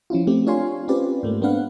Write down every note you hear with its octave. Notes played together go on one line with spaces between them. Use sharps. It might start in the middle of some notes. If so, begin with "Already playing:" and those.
F3 C#4 E4 F4
A3 C4 G4
D4 F4 C#5 F5 G#5 C6
C4 C#4 F4 G4 B4 D5
G#2 A3 A#3
B3 C4 D4 B4 F5 F#5